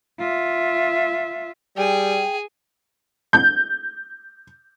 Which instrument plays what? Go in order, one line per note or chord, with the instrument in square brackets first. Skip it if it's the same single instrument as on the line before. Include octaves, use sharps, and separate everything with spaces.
[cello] F4 E5
[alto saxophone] G3 [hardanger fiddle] G#4 [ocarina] G5
[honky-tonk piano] G6